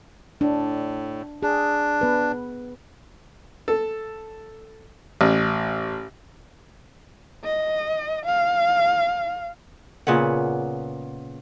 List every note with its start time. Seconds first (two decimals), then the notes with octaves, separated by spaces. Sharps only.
0.41 A2 D4
1.43 D4 G#4
2.01 B3 B4
3.68 A4
5.21 A1
7.44 D#5
8.26 F5
10.07 A#2 C#3 B3 F#5